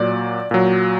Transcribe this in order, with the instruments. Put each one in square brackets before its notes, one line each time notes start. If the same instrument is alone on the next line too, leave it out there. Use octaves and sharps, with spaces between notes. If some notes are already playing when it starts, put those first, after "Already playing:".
Already playing: [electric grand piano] A#2 F#3 D5
A#2 F#3